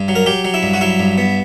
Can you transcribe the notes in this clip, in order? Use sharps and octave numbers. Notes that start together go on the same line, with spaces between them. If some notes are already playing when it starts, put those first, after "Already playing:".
Already playing: G2
F#3
A#4
F#3 G4
F#3
E4
G2
F#4
F#3 E4
G2
B3